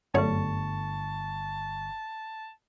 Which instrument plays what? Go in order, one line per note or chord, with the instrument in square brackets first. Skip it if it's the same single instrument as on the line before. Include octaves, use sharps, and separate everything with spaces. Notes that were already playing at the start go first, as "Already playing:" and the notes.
[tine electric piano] G1 C#6 [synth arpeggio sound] F#2 C#5 [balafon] A3 A4 D5 [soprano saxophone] A5